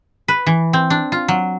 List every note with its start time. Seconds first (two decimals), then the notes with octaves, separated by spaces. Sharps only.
0.28 B4
0.46 E3
0.73 C4
0.90 D4
1.12 F4
1.28 F#3